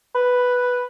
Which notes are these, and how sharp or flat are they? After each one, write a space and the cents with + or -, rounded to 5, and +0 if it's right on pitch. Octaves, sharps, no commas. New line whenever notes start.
B4 +0